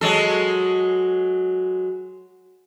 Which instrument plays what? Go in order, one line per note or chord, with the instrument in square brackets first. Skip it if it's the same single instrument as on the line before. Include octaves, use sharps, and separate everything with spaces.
[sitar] F#3 G#3 A4